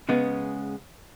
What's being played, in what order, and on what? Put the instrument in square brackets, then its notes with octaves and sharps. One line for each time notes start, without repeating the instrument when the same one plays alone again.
[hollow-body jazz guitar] C#3 G#3 B3 C#4